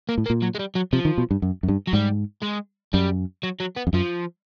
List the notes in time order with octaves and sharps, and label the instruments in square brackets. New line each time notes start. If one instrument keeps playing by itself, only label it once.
[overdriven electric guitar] A#3
[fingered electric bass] A2
[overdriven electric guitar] A#3
[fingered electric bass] A#2
[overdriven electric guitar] F#3
G#3
G3
F#3
[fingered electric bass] C3 [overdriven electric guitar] F3
[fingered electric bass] D#3
B2
G2
F#2
F#2
G2
[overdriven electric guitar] F#3
[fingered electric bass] G#2 [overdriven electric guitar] G3
[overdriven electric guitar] G#3
[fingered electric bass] F#2 [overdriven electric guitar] G3
[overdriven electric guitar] F#3
F#3
B3
[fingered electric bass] F2
[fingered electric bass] F#2 [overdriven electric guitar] F3